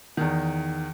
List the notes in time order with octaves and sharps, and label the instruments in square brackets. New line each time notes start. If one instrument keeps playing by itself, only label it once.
[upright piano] E2 D#3